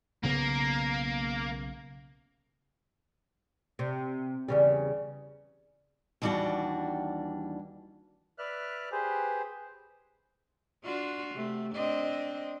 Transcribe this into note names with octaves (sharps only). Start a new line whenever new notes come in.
B1 C#3 A#3 B3
C3
E2 C#3 G3
D#2 E3 G3 D4 F#4 G5
B4 D5 E5 F6 F#6
G4 G#4 B4 C5
D4 F4 F#4
C3 A3
C4 D4 D#5